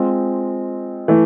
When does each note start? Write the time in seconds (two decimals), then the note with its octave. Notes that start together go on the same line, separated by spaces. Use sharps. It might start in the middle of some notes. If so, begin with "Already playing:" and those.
Already playing: G#3 C4 F4
1.08 E3 A3